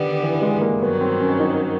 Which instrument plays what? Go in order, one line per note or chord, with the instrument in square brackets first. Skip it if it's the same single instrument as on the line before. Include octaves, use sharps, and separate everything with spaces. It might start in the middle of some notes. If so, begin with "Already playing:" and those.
Already playing: [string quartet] D3 G3 B3 [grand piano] D#3
[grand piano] E3
G#3
A#3
[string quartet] G2 D#3 F#3 [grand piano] B3
[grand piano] C4
C#4
D#4